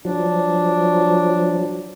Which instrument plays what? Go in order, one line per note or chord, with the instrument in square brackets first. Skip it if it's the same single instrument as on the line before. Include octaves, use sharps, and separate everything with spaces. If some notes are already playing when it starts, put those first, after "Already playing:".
[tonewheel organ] F3 F#3 [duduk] D4